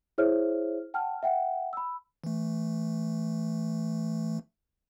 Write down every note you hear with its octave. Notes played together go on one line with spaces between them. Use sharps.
E4 G#4 C5 C#5 E5 F6
F#5 G5 A5 F6
E5 F#5 G5
B5 E6
E3 A3